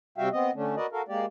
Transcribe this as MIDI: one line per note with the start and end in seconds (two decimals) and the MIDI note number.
0.18 0.29 48
0.18 0.29 55
0.18 0.29 66
0.18 0.29 76
0.18 0.29 77
0.18 0.29 79
0.32 0.51 59
0.32 0.51 60
0.32 0.51 75
0.55 0.75 50
0.55 0.75 57
0.55 0.75 61
0.55 0.75 62
0.76 0.86 66
0.76 0.86 70
0.76 0.86 71
0.76 0.86 74
0.76 0.86 75
0.92 1.02 66
0.92 1.02 69
0.92 1.02 70
0.92 1.02 77
1.08 1.25 56
1.08 1.25 58
1.08 1.25 67
1.08 1.25 74